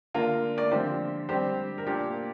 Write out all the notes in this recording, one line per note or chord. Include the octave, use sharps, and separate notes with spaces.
D3 A#3 D4 F4 A#4
A#4 D5
D3 F3 C4 G4 C5
D3 G3 C4 G4 C5
A#4
A#2 A#3 D4 G4